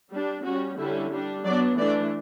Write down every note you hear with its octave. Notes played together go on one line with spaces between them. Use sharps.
G3 D4
G3 C#4 F#4
D3 G3 C#4 E4
G3 D4
F#3 B3 D4 D5
E3 A3 D4 D5